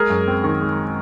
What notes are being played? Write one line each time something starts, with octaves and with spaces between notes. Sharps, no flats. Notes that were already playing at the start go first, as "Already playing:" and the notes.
Already playing: G#3 G#4 A#4
F#2
C4
D#3
G#3